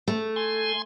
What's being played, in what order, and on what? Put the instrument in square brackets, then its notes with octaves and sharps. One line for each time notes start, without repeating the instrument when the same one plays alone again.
[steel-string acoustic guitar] A3
[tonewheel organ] G#5 C6